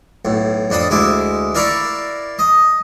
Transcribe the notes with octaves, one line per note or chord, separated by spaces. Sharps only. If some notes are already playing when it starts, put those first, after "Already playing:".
B1 A2
F2 D4 B5 D#6
D2 G#3 E4 D6
E4 A#4 D5 F5 B5 C#6
D#5